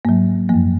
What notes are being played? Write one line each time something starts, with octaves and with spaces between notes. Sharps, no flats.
G#2 F#3 A#3
F#2 F3 A#3